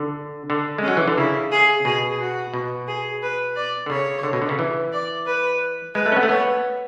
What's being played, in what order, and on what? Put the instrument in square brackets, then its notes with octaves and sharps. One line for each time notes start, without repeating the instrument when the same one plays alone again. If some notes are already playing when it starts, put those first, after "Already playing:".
Already playing: [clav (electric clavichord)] D3
D3
[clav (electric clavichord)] G#3 [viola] C#4
[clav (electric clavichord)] F#3
E3
D3
[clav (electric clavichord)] C#3 [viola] E4
[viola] G#4
[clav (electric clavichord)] B2 [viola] G#4
[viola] F#4
[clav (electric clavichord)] B2
[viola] G#4
B4
D5
[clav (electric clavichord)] D3
[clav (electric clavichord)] C#3 [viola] C#5
[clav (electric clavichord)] D3
B2
D3
C#3
E3
[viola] D5
B4
[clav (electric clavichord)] G#3 [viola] B4
[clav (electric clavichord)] A3
C#4
B3
A3
[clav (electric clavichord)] B3 [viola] C#5